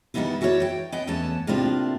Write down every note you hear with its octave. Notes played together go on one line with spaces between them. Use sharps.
D#3 E3 G3 B3 D#4 E4
E4 F#4 A4 A#4 C#5 D5
G5
B3 D#5 G5
E2 A3 B3 C#4 A5
A2 C3 A#3 D4 F4 G4